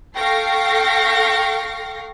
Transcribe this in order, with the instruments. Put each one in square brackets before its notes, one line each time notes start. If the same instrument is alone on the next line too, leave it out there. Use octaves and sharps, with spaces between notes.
[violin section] A4 F5 G5 C#6 A#6 C7